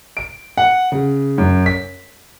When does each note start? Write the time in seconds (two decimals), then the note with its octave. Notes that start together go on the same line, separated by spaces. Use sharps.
0.17 D7
0.57 F#5
0.92 C#3
1.38 F#2
1.66 B6